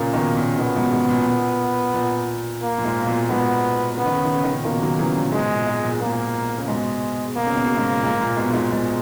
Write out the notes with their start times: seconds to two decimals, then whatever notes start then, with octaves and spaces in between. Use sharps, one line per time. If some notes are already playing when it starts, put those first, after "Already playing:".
Already playing: A#2 C#3 A#3
0.13 B2 D#3
0.36 A#2 C#3
0.58 B2 D#3 B3
0.76 G#2 B2
0.92 G#2
1.09 A#2
1.26 A#2
1.94 A#2
2.62 A#3
2.78 A#2
2.85 G#2
3.02 B2
3.07 A#2
3.29 G#2 B2 B3
3.97 C#3 B3
4.06 D#3
4.15 C#3
4.25 D#3
4.34 C#3
4.44 D#3
4.52 A#2 C#3
4.64 B2 D#3 A#3
4.82 D#3 F#3
4.98 C#3 E3
5.16 A#2 C#3
5.32 G#2 B2 G#3
5.49 A#2
5.67 G#2
5.83 A#2
6.01 A#2 A#3
6.58 C#3
6.67 G#2 B2 G#3
7.36 B2 A#3
7.47 C#3
7.56 B2
7.66 C#3
7.76 G#2 B2
8.00 A#2
8.04 G#2
8.20 A#2
8.37 G#2 B2
8.50 A#2
8.54 G#2
8.71 G#2 G#3